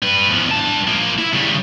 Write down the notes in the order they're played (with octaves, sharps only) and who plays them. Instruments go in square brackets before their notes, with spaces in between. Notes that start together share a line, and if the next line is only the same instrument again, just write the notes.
[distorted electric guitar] G3 B4
E2 F3
G2 A5
F3 A#3
E4
C#3 G3